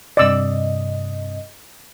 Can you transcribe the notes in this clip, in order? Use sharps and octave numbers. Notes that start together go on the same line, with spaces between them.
G2 C3 D5 D#5 E6